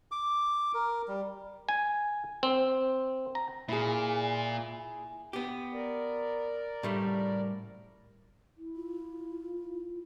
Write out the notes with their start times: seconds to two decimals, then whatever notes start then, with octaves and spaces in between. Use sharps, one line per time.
0.11 D6
0.74 A#4
1.08 G3
1.69 G#5
2.43 C4
3.35 A#5
3.69 A#2 E4 G#4
5.33 B3 G4
5.73 A#4 D5
6.83 A2 G3 A3
8.58 E4
8.76 F4